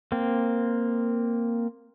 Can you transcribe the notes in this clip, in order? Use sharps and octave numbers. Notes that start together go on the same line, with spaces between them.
A#3 C4